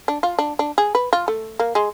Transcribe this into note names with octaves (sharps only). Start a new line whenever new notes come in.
D4
F4
D4
D4
G#4
B4
F4
A3
A#3
G#3